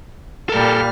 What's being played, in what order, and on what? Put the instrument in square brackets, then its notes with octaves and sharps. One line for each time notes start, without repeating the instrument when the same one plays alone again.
[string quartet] A#2 G3 F6 [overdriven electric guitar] A4 A#4